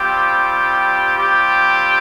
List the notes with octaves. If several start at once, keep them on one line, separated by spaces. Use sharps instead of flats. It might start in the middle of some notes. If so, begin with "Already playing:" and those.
Already playing: G3 C4 F4 G4
G4